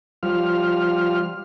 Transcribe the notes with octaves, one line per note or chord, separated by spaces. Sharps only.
F3 G3 F4 F6